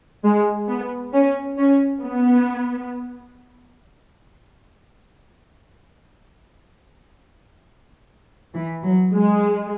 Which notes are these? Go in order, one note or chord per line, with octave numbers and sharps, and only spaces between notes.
G#3
B3
C#4
C#4
B3
E3
F#3
G#3